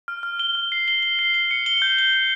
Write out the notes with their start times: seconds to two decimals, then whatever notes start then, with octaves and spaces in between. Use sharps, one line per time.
0.08 F6
0.23 F6
0.39 G7
0.55 F6
0.72 C7
0.88 G7
1.03 G7
1.19 C7
1.34 G7
1.51 C#7
1.66 G7
1.82 G6
1.99 G7
2.14 G7